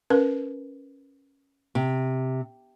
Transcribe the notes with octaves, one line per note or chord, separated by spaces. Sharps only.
C#4 A#4 B4
C3